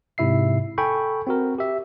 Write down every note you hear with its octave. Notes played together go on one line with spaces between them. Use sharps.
G#2 C3 E4 E5 C7
A4 G5 G#5 B5 C#6
C4 F#4 A#4
G4 E5